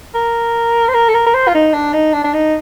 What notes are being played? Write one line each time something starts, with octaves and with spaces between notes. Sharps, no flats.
A#4
C5
A#4
A4
A#4
A#4
C5
F4
D#4
D4
D#4
D4
D4
D#4